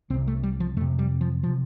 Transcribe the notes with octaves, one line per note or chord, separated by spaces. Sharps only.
C2 C3 C4
A3
G3
F3
F2 C3 A3
G3
F3
C3 F3